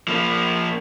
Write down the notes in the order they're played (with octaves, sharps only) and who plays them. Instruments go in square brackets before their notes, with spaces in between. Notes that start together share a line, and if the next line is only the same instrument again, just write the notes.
[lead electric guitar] F3 A#3